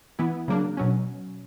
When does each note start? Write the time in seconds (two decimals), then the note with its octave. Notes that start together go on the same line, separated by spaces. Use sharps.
0.19 E3 B3 E4
0.48 C#3 F#3 A#3 D4
0.77 B2 F#3 C#4